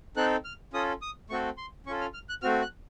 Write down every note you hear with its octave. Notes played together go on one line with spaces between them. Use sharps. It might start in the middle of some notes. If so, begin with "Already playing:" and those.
C4 D#4 A4 F#6
F6
C#4 F4 A4 D#6
D#6
A3 C4 F#4 A4 C#6
C6
C#4 F4 A4 C#6
F6
F6
F#6
A3 C4 F#4 F6
F#6